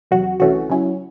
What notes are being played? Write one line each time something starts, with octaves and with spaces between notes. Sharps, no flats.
E2 C3 F#3 F#4
C2 C3 E3 A3 C#4 F#4
C#3 F#3 C#4 E4